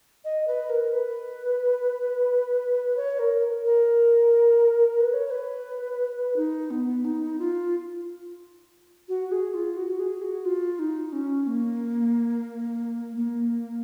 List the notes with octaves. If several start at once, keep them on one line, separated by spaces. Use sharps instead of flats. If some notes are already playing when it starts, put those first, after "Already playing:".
D#5
B4
A#4
B4
C#5
A#4
A#4
B4
C#5
C#5
B4
D#4
B3
D#4
F4
F#4
G#4
F4
F#4
G#4
F#4
F4
D#4
C#4
A#3
A#3